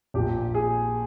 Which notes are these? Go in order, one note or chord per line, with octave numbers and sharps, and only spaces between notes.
A#1 A#2 G4
G#4